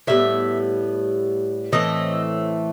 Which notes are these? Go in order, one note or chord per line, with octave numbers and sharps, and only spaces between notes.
A2 G3 B3 E5
A2 E3 A3 C4 D#5